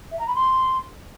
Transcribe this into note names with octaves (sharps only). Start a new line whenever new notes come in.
E5
A#5
B5
C6